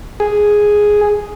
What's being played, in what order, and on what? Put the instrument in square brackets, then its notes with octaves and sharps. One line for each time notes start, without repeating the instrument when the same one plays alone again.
[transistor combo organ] G#4